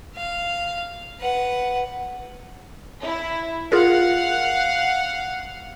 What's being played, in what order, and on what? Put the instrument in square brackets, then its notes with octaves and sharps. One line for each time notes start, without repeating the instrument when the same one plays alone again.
[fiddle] F5
B4 F#5
[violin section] E4
[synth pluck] F4 G#4 A#4 [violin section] F5 F#5